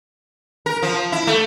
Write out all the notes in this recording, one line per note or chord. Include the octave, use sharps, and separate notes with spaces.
A#4
F3
E4
A3